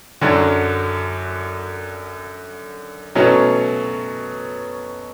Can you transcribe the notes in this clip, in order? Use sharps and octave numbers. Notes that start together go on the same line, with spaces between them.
F#2 D3 F#3
B2 F#3 A3 C#4